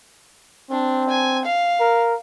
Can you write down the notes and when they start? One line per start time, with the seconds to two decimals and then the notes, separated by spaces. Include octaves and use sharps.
0.71 C4 D4
1.10 G#5
1.45 F5
1.80 A#4